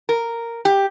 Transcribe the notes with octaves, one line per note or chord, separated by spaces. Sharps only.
A#4
G4